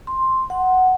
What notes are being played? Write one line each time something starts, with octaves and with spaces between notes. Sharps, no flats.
C6
F#5